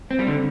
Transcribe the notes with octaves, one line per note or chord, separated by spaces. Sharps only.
C4
G3
D3